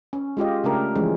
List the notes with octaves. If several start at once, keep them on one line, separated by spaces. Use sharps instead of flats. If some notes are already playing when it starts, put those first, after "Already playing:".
C#4
G#3 F4 G4 D#5
C#3 A3 D4 G4 A#4
E3 F3 G#3 C#4